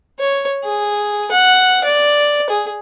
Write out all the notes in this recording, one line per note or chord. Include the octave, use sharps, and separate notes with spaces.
C#5
G#4
F#5
D5
G#4